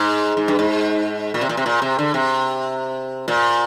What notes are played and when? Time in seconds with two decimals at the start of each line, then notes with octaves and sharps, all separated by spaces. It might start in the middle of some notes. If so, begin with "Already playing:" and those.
Already playing: G#2
0.37 G#2
0.48 G2
0.59 G#2
1.34 A#2
1.41 C3
1.49 A#2
1.57 C3
1.66 A#2
1.82 C3
1.99 D3
2.14 C3
3.28 A#2